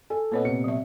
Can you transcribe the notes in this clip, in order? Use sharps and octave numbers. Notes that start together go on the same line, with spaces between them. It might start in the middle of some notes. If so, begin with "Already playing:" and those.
A4 G#5
A#2 B3 C4 C#5 D#5
C3 C#7
F#3 E5